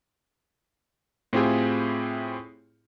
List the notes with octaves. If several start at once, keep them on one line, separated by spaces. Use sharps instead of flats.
A2 C4 E4 F4 G4 G#4